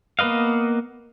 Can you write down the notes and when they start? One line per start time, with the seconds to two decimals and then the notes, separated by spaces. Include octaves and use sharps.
0.19 A#3 B3 B4 D#5 F5